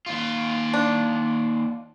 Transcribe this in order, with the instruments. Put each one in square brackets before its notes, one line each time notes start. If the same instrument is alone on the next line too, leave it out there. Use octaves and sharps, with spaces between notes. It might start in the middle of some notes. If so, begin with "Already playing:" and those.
[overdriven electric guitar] D#2 F4
[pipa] D4